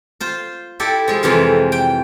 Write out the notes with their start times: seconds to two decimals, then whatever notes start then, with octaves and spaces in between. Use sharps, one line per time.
0.20 F4 C5
0.80 E4 G4 A4 D5
1.08 F3 G#3
1.23 F2 C3 E3 F4
1.72 G5